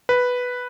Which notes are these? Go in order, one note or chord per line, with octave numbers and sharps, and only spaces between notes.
B4